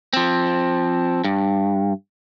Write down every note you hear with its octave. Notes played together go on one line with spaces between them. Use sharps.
F3 C4
G2